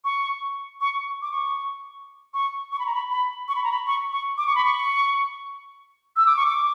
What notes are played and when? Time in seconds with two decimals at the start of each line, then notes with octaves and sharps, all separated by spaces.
0.05 C#6
0.81 C#6
1.22 D6
1.32 C#6
2.34 C#6
2.72 C#6
2.79 B5
2.86 A#5
2.94 B5
3.10 B5
3.48 C#6
3.55 B5
3.64 A#5
3.71 B5
3.87 C#6
4.12 C#6
4.38 D6
4.47 C#6
4.55 B5
4.65 C#6
6.16 E6
6.26 D6
6.37 C#6
6.46 D6